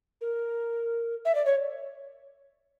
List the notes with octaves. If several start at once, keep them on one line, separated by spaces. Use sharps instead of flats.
A#4
E5
D5
C#5